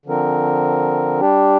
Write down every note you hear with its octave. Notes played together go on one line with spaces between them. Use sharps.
D3 F3 C4 A#4
G3 D4 G4